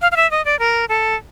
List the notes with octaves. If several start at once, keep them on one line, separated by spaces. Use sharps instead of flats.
F5
F5
E5
D#5
D5
A#4
A4